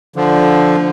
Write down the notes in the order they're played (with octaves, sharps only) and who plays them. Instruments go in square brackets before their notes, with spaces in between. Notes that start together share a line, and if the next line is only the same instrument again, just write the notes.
[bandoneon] D3 F3